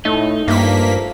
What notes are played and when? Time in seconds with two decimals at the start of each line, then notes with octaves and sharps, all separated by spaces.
0.05 A2 A3 D#4
0.48 G2 F3 A3 A#3 B6